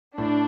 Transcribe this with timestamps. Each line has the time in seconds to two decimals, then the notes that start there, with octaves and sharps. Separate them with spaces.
0.17 A2 D4